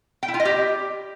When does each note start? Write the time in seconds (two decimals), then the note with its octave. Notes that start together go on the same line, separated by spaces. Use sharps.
0.23 G5
0.28 E4
0.34 F4
0.40 D#5
0.45 G4